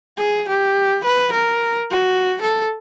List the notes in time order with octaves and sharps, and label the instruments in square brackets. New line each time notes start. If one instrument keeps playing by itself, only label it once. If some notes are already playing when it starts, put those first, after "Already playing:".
[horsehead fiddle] G#4
G4
B4
A#4
F#4
A4